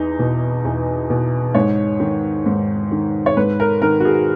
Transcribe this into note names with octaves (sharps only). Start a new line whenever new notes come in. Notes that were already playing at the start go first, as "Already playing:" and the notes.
Already playing: E2 D#4
B2
E2
B2
G#2 C#5
D#3
G#2
D#3
C#5
G#2 B4
A#4
D#3 A#4
F#4
G#4